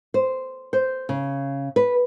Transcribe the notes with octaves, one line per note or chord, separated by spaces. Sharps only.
C5
C5
C#3
B4